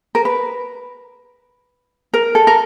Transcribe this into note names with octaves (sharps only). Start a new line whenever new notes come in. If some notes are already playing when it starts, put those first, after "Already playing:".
A#4
B4
A#4
A4
A#4